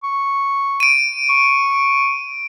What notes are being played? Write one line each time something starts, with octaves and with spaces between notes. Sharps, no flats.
C#6
D7 D#7
C#6